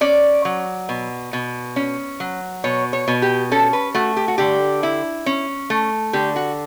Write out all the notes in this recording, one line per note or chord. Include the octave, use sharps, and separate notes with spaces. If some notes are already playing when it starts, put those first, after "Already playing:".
C#4 D5
F#3
B2
B2
C#4
F#3
B2 C#5
C#5
B2
G4
C#4 A4
B4
A3 F#4
G4
F#4
D3 G4
E4
C#4
A3
D3 G4
F#4